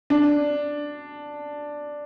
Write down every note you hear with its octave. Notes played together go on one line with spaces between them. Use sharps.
D4